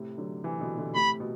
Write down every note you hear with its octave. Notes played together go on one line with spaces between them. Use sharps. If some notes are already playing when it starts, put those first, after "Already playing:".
Already playing: A2 C3
D3 F#3
C3 E3
B2 D3
B2 D3
A2 C3 B5
B2